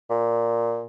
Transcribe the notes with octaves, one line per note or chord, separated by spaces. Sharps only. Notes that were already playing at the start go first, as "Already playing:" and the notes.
A#2